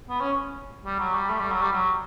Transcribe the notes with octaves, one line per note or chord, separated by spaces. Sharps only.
B3
C#4
G3
F#3
G3
A3
G3
F#3
G3
F#3